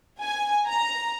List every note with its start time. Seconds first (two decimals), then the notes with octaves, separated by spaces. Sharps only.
0.22 G#5
0.67 A#5